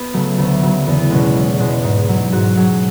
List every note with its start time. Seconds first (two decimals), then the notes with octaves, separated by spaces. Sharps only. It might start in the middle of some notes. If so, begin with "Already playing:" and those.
Already playing: B3
0.14 C#3 F#3 A3
0.38 D2 B3
0.62 C#3 F#3
0.87 E2 B3
0.99 B3
1.11 B2 G#3 C#4
1.36 E2
1.60 B2 G#3
1.84 G#2
2.09 F#3
2.32 G#2 F#4
2.57 F#3 G#4